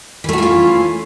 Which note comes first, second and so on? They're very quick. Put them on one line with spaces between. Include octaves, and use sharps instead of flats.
E3 A3 F#4 F4 C#4